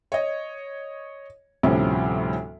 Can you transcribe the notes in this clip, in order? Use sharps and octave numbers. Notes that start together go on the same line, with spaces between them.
C#5 D#5
D2 A2 C3 F3 G3 C#4